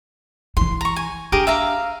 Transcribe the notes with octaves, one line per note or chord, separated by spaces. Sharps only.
E3 E4 C6
A#5 C#6
G#5
D4 G4 G#4 A#4
E5 F5 A#5